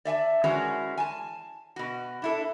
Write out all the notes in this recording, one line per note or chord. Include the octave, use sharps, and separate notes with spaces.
D5 E5 G#5 A5
E3 G#3 C#4 F#4 G#4 A#4
G#5 A5
B2 F#4
D4 E4 A4